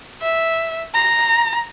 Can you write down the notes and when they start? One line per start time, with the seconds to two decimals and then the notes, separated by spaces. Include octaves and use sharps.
0.22 E5
0.94 A#5